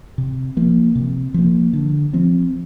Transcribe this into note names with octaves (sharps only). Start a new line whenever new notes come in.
C3
F3 A#3
C3
F3 A#3
D3
F3 C4